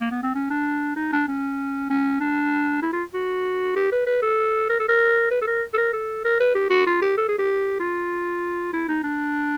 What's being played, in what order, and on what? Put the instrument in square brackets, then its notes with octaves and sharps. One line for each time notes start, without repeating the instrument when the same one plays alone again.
[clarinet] A#3
B3
C4
C#4
D4
D#4
D4
C#4
C#4
D4
E4
F4
F#4
G4
B4
B4
A4
A#4
A4
A#4
B4
A4
A#4
A4
A#4
A4
A#4
B4
G4
F#4
F4
G4
A4
G#4
G4
F4
E4
D#4
D4